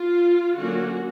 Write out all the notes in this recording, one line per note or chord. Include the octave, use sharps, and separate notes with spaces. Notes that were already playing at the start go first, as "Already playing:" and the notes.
Already playing: F4
D3 F#3 A#3 C#4 F#4